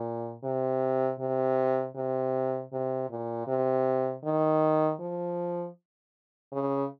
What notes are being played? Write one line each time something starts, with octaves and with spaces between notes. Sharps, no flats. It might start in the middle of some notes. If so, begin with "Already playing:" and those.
Already playing: A#2
C3
C3
C3
C3
A#2
C3
D#3
F3
C#3